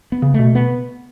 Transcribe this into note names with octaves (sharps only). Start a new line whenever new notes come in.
B3
C#3
B2 A3
B2 B3